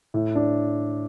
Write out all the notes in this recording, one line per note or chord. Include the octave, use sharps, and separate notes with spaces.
A2
D4